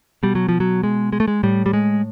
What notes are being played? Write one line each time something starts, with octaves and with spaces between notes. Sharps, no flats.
B2 G3
F#3
F3
F#3
G#3
G#3
A3
G#3
A2 G3
G3
G#3